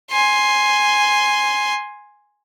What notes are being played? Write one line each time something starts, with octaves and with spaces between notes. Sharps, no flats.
G#5 C6